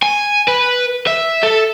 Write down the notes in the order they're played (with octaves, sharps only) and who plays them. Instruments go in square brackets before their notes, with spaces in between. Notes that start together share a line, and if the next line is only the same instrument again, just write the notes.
[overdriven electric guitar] G#5
B4
E5
A4